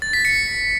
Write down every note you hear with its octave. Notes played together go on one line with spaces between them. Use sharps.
A6
B6
C#7